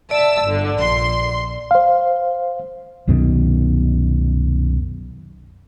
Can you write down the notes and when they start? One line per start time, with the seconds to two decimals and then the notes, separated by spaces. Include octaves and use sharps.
0.11 D5 E5 A5 E6
0.43 G1 D3
0.77 A#1 C6
1.71 C5 F5
3.08 C2 F#2 B2 D#3